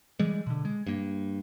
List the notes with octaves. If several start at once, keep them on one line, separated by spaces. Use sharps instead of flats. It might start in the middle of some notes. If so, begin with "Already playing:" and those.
E3 G3 G#3
B2 D3
G#3
G2 A#3